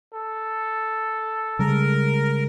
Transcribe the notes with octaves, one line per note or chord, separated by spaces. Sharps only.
A4
C#3 G3 G#3 A#4